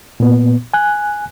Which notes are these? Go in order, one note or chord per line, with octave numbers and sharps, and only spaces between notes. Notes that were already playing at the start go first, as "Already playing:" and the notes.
A#2 B3
G#5 F#6